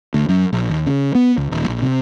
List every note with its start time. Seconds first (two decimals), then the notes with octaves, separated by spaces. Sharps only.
0.14 D2
0.29 F#2
0.53 A#1
0.69 D#2
0.86 C#3
1.15 B3
1.38 C#2
1.52 D#1
1.68 A#1
1.82 C3